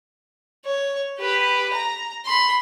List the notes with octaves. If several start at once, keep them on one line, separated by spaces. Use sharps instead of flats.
C#5
G4 B4
A#5
B5 C6